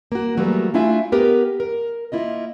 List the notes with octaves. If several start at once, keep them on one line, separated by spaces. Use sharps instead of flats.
A#3 F#4
E3 F#3 G3 A3 A#3 F#4
A3 D4 E4 F4 E5 G#5
B3 G4 A#4 B4
A#4
A#3 E4 F4 D#5